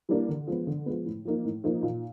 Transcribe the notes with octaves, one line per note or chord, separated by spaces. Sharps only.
E3 G3 A#3 D4
D3
F3 G#3 B3
D3
F3 G#3 B3
A2
F3 A#3 D#4
A2
F3 A#3 D#4
A#2